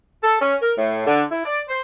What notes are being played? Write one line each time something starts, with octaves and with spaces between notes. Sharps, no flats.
A4
C#4
A#4
A2
D3
E4
D5
C5